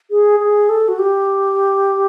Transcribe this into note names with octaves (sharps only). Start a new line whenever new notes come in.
G#4
G#4
A4
F#4
G4